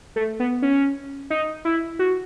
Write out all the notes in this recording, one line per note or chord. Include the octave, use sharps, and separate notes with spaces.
A3
B3
C#4
D#4
E4
F#4